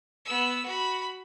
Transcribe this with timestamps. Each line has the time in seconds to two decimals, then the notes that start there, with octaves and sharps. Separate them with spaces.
0.25 B3 E6
0.65 F#4 B5